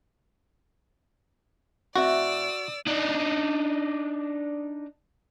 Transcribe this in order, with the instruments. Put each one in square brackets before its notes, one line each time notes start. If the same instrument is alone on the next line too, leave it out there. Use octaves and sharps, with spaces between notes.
[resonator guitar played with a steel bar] A2 C4 E5 [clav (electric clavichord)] F#4 [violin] D5 E6
[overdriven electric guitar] D4 D#4